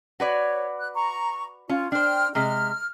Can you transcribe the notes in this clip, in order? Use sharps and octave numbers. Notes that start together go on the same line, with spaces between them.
F#4 B4 C#5 D5
F#6
A#5 C#6
C#4 F4
D4 C5 G5 F6
C3 G#3 F6